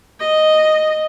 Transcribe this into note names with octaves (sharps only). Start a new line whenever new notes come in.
D#5